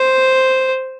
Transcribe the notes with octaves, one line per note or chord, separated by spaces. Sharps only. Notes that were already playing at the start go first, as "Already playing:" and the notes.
Already playing: C5